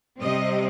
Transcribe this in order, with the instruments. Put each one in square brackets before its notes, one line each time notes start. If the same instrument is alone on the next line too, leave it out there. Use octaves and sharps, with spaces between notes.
[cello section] C3 G3 C4 D#5